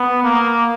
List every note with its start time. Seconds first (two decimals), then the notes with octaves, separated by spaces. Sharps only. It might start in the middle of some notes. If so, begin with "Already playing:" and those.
Already playing: B3
0.24 A#3